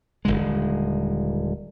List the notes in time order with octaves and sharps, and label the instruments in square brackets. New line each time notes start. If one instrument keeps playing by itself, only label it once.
[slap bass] D#1 B1 D3 G#3